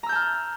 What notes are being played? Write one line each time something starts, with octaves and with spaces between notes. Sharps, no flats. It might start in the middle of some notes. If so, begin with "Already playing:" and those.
A5 A#5 E6 F6 G6